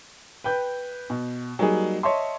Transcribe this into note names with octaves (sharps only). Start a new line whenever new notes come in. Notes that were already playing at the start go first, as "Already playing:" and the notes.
B4 G5 G6
B2
F#3 G3 A#3 D#4 G#4
C#5 D#5 E5 A5 C6